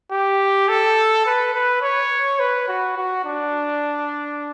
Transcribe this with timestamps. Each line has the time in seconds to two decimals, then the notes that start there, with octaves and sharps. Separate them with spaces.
0.11 G4
0.69 A4
1.26 B4
1.54 B4
1.82 C#5
2.40 B4
2.69 F#4
2.97 F#4
3.25 D4